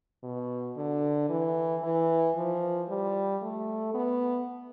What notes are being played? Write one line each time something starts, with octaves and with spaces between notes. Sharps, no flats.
B2
D3
E3
E3
F3
G3
A3
B3